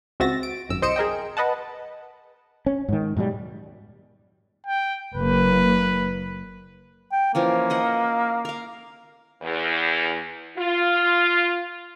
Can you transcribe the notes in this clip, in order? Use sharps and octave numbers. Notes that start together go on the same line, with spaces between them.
C#2 C4 F#4 E5 A6 A#6
D7
G#1 F#2 E6
C2 C5 D#5 C#7 D7 E7
G#4 A#4 D#5 G5
B4 D#5 F#5 A5
C#4
G#2 D#3
G#2 B2 F#3 G3
G5
F#1 A#3 B4
G5
E3 F3 A#3 C#4
A#4 D#5 F#5
A#4 F5
E2
F4